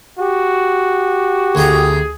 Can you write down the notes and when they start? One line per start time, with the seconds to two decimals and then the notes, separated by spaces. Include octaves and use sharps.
0.19 F#4 G4
1.55 D2 G#4 G5 A#5